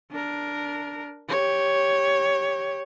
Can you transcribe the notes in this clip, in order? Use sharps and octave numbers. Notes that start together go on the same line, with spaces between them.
D4 A#4
G4 C#5